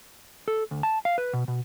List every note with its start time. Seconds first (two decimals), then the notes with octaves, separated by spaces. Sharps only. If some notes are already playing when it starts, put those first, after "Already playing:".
0.48 A4
0.71 D2
0.83 A5
1.05 F5
1.18 B4
1.33 B2
1.48 B2